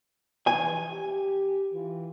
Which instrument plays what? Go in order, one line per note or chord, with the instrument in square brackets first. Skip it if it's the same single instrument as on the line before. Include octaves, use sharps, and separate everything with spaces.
[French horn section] E3 F3 [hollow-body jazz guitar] G#5
[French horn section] G4
E3 F4